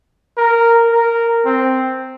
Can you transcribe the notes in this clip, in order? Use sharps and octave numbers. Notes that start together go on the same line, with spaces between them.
A#4
A#4
C4